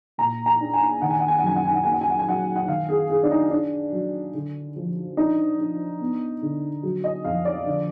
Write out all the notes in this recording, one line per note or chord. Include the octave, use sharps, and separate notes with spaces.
A#2 A#5
A#5
D4
G#5
D#3 F#5
G#5
F#5
G#5
F#5
F#2 G#5
F#5
G#5
F#5
A#3 G#5
F#5
G#5
F#5
G#5
F#3 F#5
F#5
D#3 F5
G#4
G#3 G#4
D4
D#4
D4
F#3
D3
F3
D4 D#4
D4
B3
D3
F#3
D#5
F2 F5
D5
D3